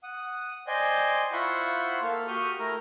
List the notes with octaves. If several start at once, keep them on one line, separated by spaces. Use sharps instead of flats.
F#5 D#6
C5 D5 D#5 G5 G#5
E4 F4 C5 F#5 B5 C#6
A#3 A4 F5
F#4 G4 C#6 D#6 F6 G6
A3 E4 A#4 A#5 F6